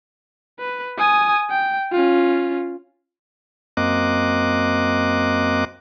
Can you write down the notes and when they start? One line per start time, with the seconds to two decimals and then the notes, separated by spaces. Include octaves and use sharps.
0.59 B4
0.98 G#5 D#6
1.50 G5
1.92 C#4 F4
3.77 F#2 A#3 C4 D#5 D6 F#6